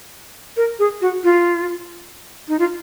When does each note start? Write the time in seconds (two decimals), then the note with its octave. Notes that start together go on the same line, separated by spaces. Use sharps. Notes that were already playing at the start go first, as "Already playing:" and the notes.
0.57 A#4
0.79 G#4
1.01 F#4
1.24 F4
2.49 D#4
2.59 F4